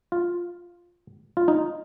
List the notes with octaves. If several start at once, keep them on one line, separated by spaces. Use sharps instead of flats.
F4
F4
D#4